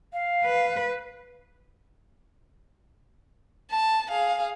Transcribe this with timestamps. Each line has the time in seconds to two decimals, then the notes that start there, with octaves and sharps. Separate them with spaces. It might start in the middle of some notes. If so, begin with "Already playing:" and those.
0.13 F5
0.45 B4
3.71 A5
4.10 G#4 F5